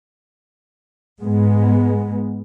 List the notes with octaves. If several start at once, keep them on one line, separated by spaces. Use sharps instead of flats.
G#2 G#3 B3